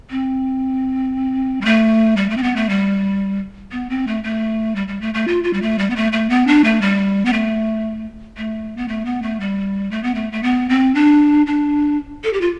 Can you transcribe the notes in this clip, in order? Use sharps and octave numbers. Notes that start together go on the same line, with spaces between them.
C4
G3
A3
G3
A3
C4
B3
A3
G3
B3
C4
A3
A3
G3
G3
A3
A3
F4
F4
G3
A3
G3
B3
A3
A3
B3
D4
A3
G3
B3
A3
A3
B3
A3
B3
A3
G3
A3
B3
A3
A3
B3
C4
D4
D4
A4
G4
F4